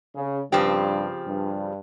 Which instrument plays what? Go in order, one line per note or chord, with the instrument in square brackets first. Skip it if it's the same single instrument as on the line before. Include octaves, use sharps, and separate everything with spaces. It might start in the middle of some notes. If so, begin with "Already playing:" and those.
[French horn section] C#3
[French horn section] G2 [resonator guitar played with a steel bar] C#3 F3 C4 G4
[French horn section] G2